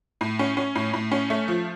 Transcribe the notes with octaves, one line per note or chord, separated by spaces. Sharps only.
A2
C#4
C#4
A2
A2
C#4
A3
F3